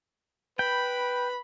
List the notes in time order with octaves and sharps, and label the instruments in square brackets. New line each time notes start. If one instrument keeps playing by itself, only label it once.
[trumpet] B4 [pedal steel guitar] G5 [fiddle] B5